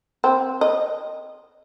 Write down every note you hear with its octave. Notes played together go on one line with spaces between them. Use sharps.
C4
D#5